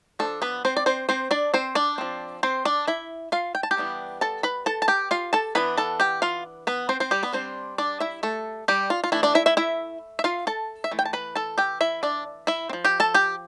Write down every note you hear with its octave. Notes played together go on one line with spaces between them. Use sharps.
F3 A3 D4 A4
B3 B4
C4 C5
D5
C4 C5
C4 C5
D4 D5
C4 C5
D4 D5
F3 C4
C4 C5
D4 D5
E4 E5
F4 F5
G5
A5
G4 G5
E3 G3 B3 D4
A4 A5
B4 B5
A4 A5
A5
G4 G5
F4 F5
A4 A5
E3 B3 D4 B4 B5
A4 A5
G4 G5
F4 F5
B3 B4
C4 C5
C4 C5
G3 G4
B3 B4
G3 C4 D4 C5
D4 D5
E4 E5
A3 A4
G3 G4
F4
F4
E3 A3 D4 E4
D4 D5
E4 E5
E4 E5
E4 E5
E5
F4 F5
A4 A5
E5
E3 A3
G5
A5
B4 B5
A4 A5
G4 G5
E4 E5
D4 D5
E4 E5
C4
F3
G4 G5
A4 A5
G4 G5